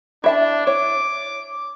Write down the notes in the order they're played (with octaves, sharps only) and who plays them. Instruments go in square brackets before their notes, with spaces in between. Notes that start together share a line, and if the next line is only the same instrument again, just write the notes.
[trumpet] D4 [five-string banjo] E4 E5 A5
[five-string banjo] C#5 [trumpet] D6